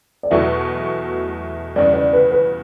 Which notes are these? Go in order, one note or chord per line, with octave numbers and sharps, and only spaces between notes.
D5
E2 B2 F#3 A3 E4 E5
E2 C#3 G3 D5
D5
B4
B4